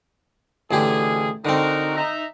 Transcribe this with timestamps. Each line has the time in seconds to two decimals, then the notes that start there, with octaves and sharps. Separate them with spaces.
0.71 A1 B2 D3 G4 G#4
1.45 D3 C4 D#4 F#4 A#4
1.96 D#4 E5 A#5